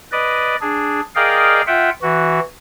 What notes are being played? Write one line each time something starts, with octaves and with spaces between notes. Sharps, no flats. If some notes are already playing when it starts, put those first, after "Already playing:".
B4 D5 D#5
D4 G#4
G#4 A#4 D5 D#5 F5 G5
F4 E5 F#5 G5
E3 F#4